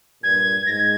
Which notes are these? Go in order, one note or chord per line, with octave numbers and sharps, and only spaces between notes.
G2 A#2 G#6
G#2 G#6 A#6